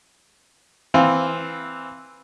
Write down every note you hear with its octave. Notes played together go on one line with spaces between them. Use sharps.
E3 C4 F5